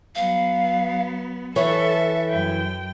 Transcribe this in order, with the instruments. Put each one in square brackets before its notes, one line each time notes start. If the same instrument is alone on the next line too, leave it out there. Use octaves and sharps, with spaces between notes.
[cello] F#3 B3 [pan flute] F5
[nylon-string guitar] E3 C#5 [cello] A4 [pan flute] E5
[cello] F#2 G5